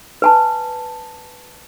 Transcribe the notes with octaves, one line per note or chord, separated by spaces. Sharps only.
B4 G#5 A5